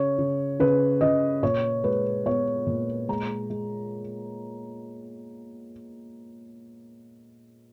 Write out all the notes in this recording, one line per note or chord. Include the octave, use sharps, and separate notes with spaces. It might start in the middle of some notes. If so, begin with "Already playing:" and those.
Already playing: C#3 C#5
C#3
C#3 B4
C#3 D#5
A#2 C#5
G#3 B4
B3 C#5
A#2
G#3 A#5
G#3